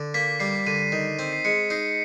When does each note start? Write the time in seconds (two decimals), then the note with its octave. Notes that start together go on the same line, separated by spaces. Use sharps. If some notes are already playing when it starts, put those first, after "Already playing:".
Already playing: D3
0.14 A#3 B6
0.40 G3 C7
0.67 D3 D#7
0.92 D#3
1.19 C4
1.33 C7
1.45 G#3 C#7
1.70 D#4 C7